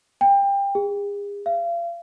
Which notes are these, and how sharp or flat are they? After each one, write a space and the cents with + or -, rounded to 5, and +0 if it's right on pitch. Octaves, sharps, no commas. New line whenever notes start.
G5 +25
G#4 -40
F5 -35